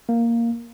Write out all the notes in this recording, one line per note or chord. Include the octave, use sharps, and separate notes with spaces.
A#3